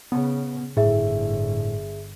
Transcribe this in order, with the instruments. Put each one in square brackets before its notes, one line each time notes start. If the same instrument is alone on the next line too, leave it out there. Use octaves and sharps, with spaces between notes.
[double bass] C#3 [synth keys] B3
[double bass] G1 [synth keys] A2 [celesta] G#4 E5